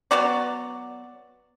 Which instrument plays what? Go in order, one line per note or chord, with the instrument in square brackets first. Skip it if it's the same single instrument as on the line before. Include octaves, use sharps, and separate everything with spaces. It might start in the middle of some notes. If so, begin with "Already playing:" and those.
[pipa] F#3 B3 F#4 D5